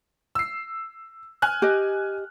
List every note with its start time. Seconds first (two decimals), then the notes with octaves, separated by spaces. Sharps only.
0.35 E6 C7
1.42 G#5 F6 F#6
1.62 G4 D#5